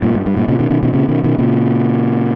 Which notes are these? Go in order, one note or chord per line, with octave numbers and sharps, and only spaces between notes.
G2 A#2
G2
G2
G2 A#2
A#2 C#3
B2 D#3
B2 D#3
B2 D#3
A#2 C#3
B2 D#3
B2 D#3
A#2 C#3